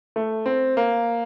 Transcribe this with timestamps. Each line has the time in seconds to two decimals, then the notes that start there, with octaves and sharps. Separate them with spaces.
0.16 A3
0.46 C4
0.77 A#3